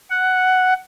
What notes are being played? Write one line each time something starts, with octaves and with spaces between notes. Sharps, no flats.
F#5